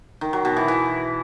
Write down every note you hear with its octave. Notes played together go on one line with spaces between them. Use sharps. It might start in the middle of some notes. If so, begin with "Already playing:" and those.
D#3
F#3
B2
E3
E3